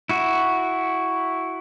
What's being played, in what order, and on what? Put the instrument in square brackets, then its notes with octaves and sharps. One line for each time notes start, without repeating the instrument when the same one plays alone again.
[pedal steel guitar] E4 F#4